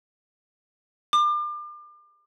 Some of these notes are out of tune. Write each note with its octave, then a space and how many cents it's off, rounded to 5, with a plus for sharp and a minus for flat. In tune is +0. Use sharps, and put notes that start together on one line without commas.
D6 +35